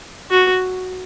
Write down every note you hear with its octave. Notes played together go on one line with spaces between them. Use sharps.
F#4